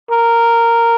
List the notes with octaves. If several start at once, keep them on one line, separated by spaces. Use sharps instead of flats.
A#4